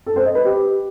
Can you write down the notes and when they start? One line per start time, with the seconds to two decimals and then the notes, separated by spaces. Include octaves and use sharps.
0.06 A4
0.16 C5
0.26 D#5
0.35 B4
0.45 G4